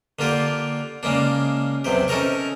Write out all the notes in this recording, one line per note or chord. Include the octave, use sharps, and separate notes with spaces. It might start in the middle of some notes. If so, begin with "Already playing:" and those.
D3 A#3 F4 G4
C#3 G#3 A#3 D4
B1 E2 C3 G4
C#4 D#4 A4 A#4 C#6